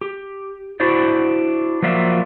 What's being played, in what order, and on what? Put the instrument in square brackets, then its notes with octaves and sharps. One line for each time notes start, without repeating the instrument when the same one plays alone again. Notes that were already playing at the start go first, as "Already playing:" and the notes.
[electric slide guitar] G4
D4 E4 F#4 C5 D5
F3 F#3 A#3 F4 D5 E5